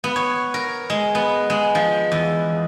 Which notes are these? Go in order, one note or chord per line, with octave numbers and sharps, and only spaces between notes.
B3
C#5
A#4
G#3
B3
G#3
F3
E2